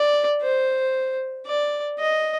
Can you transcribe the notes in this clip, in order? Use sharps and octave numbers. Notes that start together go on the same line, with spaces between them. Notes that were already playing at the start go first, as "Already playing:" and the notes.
Already playing: D5
C5
D5
D#5